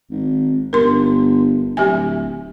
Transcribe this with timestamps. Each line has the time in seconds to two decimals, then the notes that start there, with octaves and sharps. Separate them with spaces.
0.11 G#1
0.73 G1 A#4 C6
1.77 D1 G4 E5 G#5